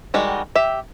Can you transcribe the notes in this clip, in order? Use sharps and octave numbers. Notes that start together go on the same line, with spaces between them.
D#3 G3 G#3 F#4
G4 E5